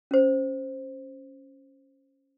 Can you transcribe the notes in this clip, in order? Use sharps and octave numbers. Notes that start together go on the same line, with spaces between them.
C#4 C5